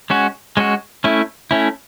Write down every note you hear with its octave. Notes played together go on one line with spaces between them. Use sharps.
G#3 C#4 F#4
G#3 C#4 F#4
A3 C#4 E4
A3 C#4 E4